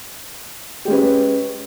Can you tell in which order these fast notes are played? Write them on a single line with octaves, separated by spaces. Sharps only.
G4 G#3 C#4 B4